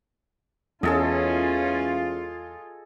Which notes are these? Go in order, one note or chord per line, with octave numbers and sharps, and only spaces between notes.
E2 E3 G#3 C#4 F4 G#4 A4 D#5